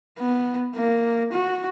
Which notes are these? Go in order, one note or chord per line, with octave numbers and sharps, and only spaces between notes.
B3
A#3
F#4